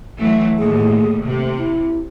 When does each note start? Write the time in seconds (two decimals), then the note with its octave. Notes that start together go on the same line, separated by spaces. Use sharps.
0.18 E3 F#3 A3
0.59 D#2 A2 G#4
1.25 C3 A3
1.57 E4